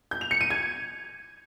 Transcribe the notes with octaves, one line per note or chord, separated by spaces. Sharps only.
G6
F7
C#7
D#7
G#6